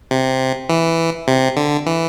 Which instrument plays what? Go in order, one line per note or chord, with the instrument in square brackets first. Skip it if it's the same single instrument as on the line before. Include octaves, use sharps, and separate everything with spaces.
[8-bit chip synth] C3
E3
C3
D3
E3